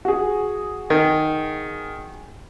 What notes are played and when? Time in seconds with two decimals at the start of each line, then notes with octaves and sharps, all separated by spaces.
0.05 F#4 G#4
0.90 D#3